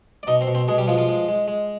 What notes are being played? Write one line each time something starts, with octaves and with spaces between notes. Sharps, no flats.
D5
B2 D#4 D#5
C4 C5
B2
C4 C5
B2 G#3 G#4
G3 G4
F3 G#3 F4
F3 F4
G#3
G#3
G#3